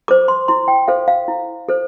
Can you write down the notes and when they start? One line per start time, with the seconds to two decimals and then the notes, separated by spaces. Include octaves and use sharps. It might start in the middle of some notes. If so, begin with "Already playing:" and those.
0.08 A4 C5 D6
0.28 C6
0.48 E4 C6
0.68 G5
0.88 A4 C5 F5
1.08 F5
1.28 E4
1.69 A4 C5